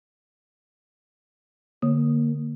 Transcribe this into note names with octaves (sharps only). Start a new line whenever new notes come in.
D3 A#3